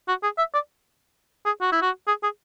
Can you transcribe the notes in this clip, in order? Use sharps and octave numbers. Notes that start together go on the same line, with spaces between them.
F#4
G#4
E5
D5
G#4
F#4
E4
F#4
G#4
G#4